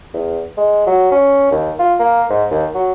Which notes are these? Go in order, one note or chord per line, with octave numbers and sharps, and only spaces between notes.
E2
G#3
F#3
C#4
D#2
F4
A#3
G#2
D#2
F#3